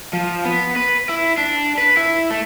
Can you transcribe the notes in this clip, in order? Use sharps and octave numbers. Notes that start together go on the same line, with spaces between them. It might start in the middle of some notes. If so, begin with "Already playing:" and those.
F3
B3
B4
E4
D4
B4
E4
A3